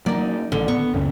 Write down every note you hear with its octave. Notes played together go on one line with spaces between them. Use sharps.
F#3 A#3 D#4 D5
A1 D3
B3 C#6
C#2 F#2 C#3